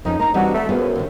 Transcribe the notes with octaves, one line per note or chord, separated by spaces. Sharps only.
F2 F3 C#4 D#4
A#3 D#4 A#5
E3 G3 C4 D4 D#4 F#4
A3
C2 F#2 B3 F4 G#4
D#2 D3